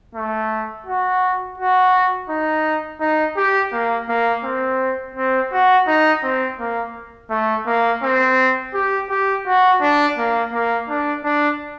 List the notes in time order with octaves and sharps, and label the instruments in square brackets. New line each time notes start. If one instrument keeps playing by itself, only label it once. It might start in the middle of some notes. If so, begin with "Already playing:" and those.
[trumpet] A3
F#4
F#4
D#4
D#4
G4
A#3
A#3
C4
C4
F#4
D#4
C4
A#3
A3
A#3
C4
G4
G4
F#4
D4
A#3
A#3
D4
D4